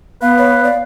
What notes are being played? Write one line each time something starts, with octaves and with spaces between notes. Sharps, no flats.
B3 B4 F5
C#5
D5